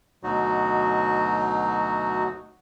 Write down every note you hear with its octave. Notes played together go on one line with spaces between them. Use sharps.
D2 B2 F#3 D#4 F#4